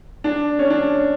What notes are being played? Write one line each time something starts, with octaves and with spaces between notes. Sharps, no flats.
D4
C#4
D4